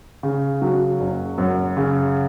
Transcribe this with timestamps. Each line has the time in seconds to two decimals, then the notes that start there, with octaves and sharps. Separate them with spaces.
0.23 C#3
0.62 F#3
1.00 F#1
1.38 F#2
1.77 C#3